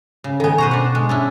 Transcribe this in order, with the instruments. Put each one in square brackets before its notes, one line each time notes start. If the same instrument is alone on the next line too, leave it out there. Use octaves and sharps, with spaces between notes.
[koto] C#3
[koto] D#3 B3 [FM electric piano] A4 G#5
[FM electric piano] B2 C#6 [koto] B4 C5 A#5
[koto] D4 F#5
G#3
C#4 D4 E4